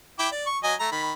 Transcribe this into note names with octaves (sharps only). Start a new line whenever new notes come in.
E4 G5 D6
D5
C#6
F#3 D#5 G#5
A3 A#5
D#3 B5